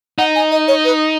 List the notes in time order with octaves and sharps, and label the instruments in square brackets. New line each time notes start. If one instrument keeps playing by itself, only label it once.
[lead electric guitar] D#4 [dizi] F#5
[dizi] G#5
D#5
C#5
B4